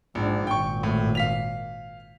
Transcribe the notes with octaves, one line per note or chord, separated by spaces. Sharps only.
A#1 G#2 D4
G#1 A#2 G5 C#6
A2
F5 B6 F7